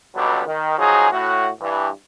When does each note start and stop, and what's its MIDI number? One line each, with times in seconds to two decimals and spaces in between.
0.15 0.41 37
0.15 0.41 47
0.15 0.41 50
0.15 0.41 54
0.15 0.41 55
0.15 0.41 59
0.47 0.75 51
0.79 1.08 53
0.79 1.08 54
0.79 1.08 63
0.79 1.08 68
1.12 1.48 45
1.12 1.48 66
1.61 1.88 43
1.61 1.88 52